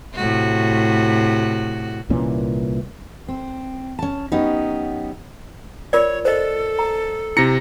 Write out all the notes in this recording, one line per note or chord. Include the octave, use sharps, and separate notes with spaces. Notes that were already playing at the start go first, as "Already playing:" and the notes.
A2 C3 F#4
C2 A#2 E3 C#4
C4
C#4 A5
F#3 B3 C#4 D#4 G4
F4 A#4 C#5 D5
A4 C5 D#5
A#5
C3 E4 A#6 C#7